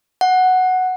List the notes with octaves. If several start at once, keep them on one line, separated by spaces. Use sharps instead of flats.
F#5